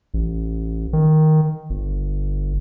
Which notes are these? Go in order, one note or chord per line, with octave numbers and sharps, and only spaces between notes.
A1
D#3
G1